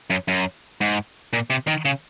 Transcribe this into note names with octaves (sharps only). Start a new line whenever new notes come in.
F#2
F#2
G#2
A#2
C3
D#3
C#3